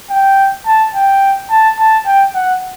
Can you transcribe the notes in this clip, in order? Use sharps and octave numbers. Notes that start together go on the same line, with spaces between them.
G5
A5
G5
A5
A5
G5
F#5